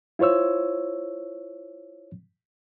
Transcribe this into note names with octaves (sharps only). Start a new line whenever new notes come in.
E4 F4 C5 C#5 E6